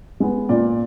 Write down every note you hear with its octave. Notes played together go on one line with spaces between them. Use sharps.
G#3 B3
A#2 D5